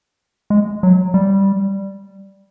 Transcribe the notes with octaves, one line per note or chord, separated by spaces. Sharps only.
G#3
F#3
G3